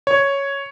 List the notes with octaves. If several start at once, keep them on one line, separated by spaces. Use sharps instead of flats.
C#5